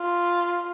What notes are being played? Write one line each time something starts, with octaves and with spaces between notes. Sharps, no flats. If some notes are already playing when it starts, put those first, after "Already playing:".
Already playing: F4